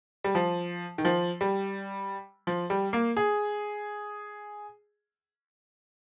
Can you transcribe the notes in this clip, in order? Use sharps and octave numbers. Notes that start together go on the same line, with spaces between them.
G3
F3
D#3
F3
G3
F3
G3
A#3
G#4